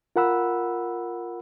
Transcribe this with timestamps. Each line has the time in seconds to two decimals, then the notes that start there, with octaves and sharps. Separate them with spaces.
0.16 F4 A#4 F#5 B5 E6